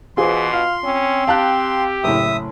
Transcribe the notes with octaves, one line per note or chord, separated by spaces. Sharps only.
B2 E3 F4 G#4 C5 C6
F4 F5
C4 C#4
G4 F5 A5 F#6
F#1 A2 E5 D#6